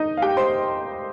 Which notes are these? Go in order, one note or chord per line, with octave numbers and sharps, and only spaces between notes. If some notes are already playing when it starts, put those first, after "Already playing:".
Already playing: D#4 D#5
F5
G4 G5
C5 C6